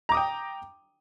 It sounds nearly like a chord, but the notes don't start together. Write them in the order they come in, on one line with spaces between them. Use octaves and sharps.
A#5 D6 D#6 G5